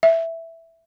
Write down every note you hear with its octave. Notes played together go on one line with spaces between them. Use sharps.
E5